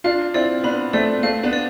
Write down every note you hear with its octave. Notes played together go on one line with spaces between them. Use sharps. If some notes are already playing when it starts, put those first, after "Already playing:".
D4 F4 F5
C4 E4 D5
B3 D4 B5
A3 C4 D5
A3 C4 F5
B3 D4
D5